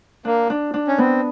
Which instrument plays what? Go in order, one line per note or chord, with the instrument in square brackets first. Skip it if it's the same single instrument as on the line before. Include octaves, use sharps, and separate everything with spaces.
[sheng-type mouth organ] A#3 [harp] D4
[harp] D4
D4
[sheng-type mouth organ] C#4
[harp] B3 [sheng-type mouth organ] C4